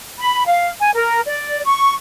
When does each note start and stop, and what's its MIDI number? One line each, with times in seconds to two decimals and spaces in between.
0.18 0.44 83
0.45 0.70 77
0.79 0.91 80
0.94 1.20 70
1.26 1.61 74
1.63 1.92 85